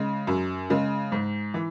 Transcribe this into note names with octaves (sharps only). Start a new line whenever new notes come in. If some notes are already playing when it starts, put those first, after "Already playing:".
Already playing: C#3 G#3
F#2
C#3 G#3
G#2
E3